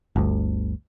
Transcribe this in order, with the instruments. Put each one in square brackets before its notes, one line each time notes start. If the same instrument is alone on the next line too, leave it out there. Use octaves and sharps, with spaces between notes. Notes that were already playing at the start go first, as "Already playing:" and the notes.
[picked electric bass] G1 D2